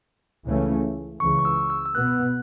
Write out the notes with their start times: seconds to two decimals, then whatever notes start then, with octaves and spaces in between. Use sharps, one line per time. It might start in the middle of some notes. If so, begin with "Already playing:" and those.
0.46 C#2 C#3 E3 A3 C#4
1.20 C#2 C#3 E3 C#6
1.39 C#6
1.45 E6
1.70 E6
1.86 E6
1.95 B2 B3 F#6